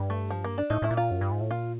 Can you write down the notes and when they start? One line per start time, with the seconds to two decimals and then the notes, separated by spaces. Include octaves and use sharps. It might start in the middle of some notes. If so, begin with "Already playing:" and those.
Already playing: G2
0.10 A3
0.30 F3
0.44 A#3
0.58 D4
0.70 A2 D#4
0.82 A2 E4
0.91 A#2
0.97 F4
1.11 F#2
1.21 G2
1.31 G#2
1.41 A2
1.51 A#2 F4